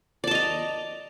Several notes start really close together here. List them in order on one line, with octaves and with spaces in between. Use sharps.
D5 A5 D#5 A#5